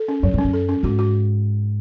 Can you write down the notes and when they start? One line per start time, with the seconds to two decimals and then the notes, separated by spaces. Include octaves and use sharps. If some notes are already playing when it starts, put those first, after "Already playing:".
Already playing: A4
0.08 C#4
0.23 F#2 F#3
0.34 G#2 C#4
0.44 F#2
0.53 A4
0.69 C#4
0.83 G#2 F#4
0.99 F#4